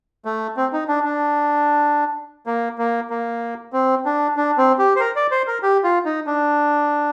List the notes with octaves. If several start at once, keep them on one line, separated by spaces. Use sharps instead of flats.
A3
C4
D#4
D4
D4
A#3
A#3
A#3
C4
D4
D4
C4
G4
C5
A#4
D5
C5
A#4
G4
F4
D#4
D4